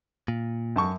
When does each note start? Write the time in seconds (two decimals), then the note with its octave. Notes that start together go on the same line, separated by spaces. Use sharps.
0.28 A#2
0.76 F#2 A5 C#6